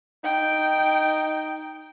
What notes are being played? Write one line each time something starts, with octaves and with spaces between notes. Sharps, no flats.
D#4 G5